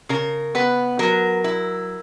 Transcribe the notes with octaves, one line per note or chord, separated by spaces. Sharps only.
C#3 A#4
B3 B4
F#3 A#4
E4